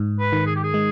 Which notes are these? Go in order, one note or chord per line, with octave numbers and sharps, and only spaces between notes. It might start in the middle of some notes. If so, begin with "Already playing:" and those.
Already playing: G#2
B4
D#3
G#4
G4
G#4
G#3